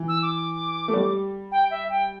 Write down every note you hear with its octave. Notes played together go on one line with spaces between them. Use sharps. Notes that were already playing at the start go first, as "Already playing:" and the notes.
Already playing: E3
E6
D6
A3
G3
G5
E5
G5